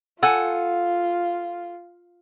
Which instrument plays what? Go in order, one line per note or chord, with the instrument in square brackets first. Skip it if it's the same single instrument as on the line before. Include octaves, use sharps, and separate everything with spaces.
[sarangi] F4 [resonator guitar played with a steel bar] A4 F#5 G#5